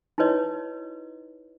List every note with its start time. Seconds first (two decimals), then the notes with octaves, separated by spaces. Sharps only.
0.18 D#4 E4 F#4 B4 C#5 D#5